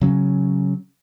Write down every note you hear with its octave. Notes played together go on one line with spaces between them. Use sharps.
C#3 F#3 C#4